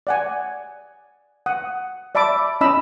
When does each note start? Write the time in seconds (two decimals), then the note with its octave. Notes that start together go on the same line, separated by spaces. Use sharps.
0.07 D5 F#5 G#5
1.46 F#5 D#6
2.15 D5 E5 A5 B5 D6
2.61 C#4 E4 D#5 A5 B5 E6